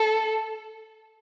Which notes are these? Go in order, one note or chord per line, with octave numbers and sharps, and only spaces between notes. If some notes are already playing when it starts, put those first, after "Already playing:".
Already playing: A4